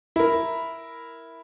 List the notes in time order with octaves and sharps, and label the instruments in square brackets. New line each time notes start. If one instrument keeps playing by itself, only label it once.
[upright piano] E4 A#4